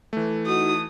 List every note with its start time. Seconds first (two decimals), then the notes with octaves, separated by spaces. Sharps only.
0.13 E3 A3
0.47 D#4 F#4 D#6